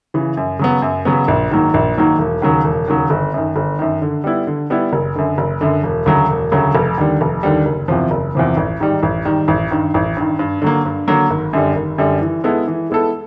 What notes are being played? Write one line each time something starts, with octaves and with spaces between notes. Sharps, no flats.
C#3 E3
F#2
C#3 F#3 B3
F#2
C#3 F#3 B3
A#1
G#2 D#3 F#3 A#3
A#1
G#2 D#3 F#3 A#3
E1
D#2 C#3 F#3
E1
D#2 C#3 F#3
G1
F#2 D#3
G1
F#2 D#3
D3
G3 B3 E4
D3
G3 B3 E4
F#1
F#2 D3
F#1
F#2 D3
E1
D2 C#3 F#3
E1
D2 C#3 F#3
F1
D#2 D3 G3
F1
D#2 D3 G3
F#1
E2 C3 F3
F#1
E2 C3 F3
A1
G#2 D#3 G3
A1
G#2 D#3 G3
A1
G2 D#3
A1
G2 D#3
G2
D3 F#3 A#3
G2
D3 F#3 A#3
G#1
F#2 D3 G3
G#1
F#2 D3 G3
E3
G#3 B3 E4 A4
E3
G#3 B3 E4 A4